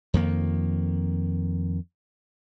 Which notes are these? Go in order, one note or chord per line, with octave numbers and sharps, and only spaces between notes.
F2 D#3 A#3